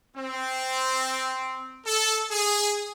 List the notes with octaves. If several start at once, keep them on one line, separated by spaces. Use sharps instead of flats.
C4
A4
G#4